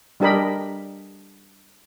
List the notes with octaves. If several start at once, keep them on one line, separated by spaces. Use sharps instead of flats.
G3 D4 G4 A#4 D#5 B5